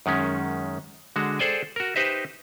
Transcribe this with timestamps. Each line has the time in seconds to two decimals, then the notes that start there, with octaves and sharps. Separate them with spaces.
0.06 F#2 D#3 G#3 C#4
1.16 D3 G#3 F#4
1.39 G#4 A4 C5 D5 G5 G#5
1.76 F#4 A#4
1.96 D#4 G4 B4 C5 D#5 E5